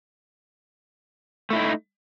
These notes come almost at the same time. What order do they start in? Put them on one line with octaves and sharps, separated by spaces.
A3 E4 D#4